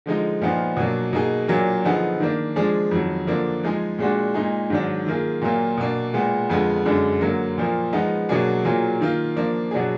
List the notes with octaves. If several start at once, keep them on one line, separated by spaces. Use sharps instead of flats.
D3 F3 G#3 D#4
A#2 F3 B3 D#4
B2 F#3 A#3 D4
B2 A#3 D#4 G#4
A#2 F#3 A#3 D4
D3 F3 B3 D#4 G#4
D#3 A#3 D4
F3 G#3 D4 G#4
F2 D#3 F#3
D3 F3 A#3 D4
F3 G#3 D#4 G#4
A#2 G#3 D4 F#4
A#2 G#3 D#4 G#4
G#2 D#3 F#3 D4
D#3 A#3 F4 G#4
A#2 F#3 A#3 F4
B2 A#3 D4
A#2 G#3 B3
F2 D3 G#3 B3 F4
F#2 D3 G#3 D4
D3 F#3 A#3
A#2 F3 A#3
F3 G#3 B3 D#4
B2 F#3 A#3 D4 G#4
A#2 F#3 A#3 F4 G#4
D#3 A#3 F4
F3 A#3 D4
B2 F#3 D4 G#4